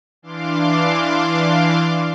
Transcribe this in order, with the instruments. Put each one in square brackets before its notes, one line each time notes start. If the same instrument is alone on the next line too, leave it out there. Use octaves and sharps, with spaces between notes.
[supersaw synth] E3 D4 F5 C6 D6